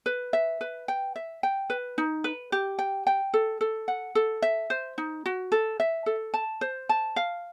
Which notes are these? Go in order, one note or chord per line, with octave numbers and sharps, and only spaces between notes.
B4
E5
B4
G5
E5
G5
B4
D#4
B4
G4
G5
G5
A4
A4
F#5
A4
E5
C5
D#4
F#4
A4
E5
A4
A5
C5
A5
F5